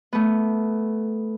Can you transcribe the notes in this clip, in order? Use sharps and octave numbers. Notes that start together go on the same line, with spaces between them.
A3 B3